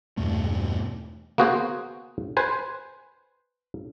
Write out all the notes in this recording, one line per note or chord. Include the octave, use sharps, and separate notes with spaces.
E2 G2 B2 A3
A#3 B3 F#4 G#4 C5
B4 C5 G#5